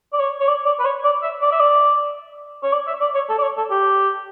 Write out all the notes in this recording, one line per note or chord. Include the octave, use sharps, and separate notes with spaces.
D5
C#5
C#5
D5
D5
B4
C#5
D5
E5
D5
E5
D5
C#5
D5
E5
D5
C#5
A4
D5
C#5
A4
G4